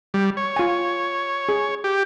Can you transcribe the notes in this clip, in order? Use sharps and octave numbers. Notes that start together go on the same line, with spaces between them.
G3
C#5
F4 G#5
G#4
G4